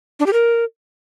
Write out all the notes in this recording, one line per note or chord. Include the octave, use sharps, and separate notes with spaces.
D4
G4
A#4